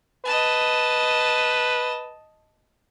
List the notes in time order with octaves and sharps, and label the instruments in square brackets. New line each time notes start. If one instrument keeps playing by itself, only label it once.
[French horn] B4 [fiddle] D#5 A5